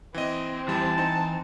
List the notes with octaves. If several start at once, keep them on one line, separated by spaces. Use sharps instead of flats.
E3 C4 D#5
F2 E3 G3 A5
D#4